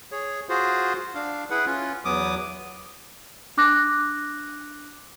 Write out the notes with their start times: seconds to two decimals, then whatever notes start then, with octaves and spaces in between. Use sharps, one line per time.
0.12 G#4 C#5
0.49 F4 F#4 G#4 C5
1.15 D4 F5
1.50 E4 G#4 B4 F#5
1.66 C#4 F4
2.05 E2 F#3 B3 D6 D#6
3.57 D4 D6 F#6 A#6